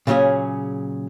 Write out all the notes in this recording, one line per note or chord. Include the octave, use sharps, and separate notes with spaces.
A#2 C#3 F#3 C#4 G#4